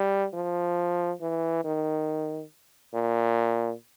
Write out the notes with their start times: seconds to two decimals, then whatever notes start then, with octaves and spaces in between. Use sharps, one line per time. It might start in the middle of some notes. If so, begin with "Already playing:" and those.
Already playing: G3
0.34 F3
1.21 E3
1.65 D#3
2.94 A#2